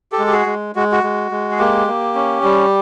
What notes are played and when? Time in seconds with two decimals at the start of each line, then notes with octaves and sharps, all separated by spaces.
0.12 G4 A4
0.19 G#3
0.27 G4
0.32 F#4 G#4
0.46 G#3
0.75 G#3 F#4
0.92 F#4
1.03 G#3
1.31 G#3
1.51 G#4
1.59 A#3 G4
1.87 A#3
2.15 C#4
2.43 G3